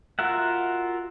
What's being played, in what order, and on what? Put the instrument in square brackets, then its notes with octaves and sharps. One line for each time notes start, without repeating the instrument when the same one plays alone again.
[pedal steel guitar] F4 F#4 A#4 E5 F#5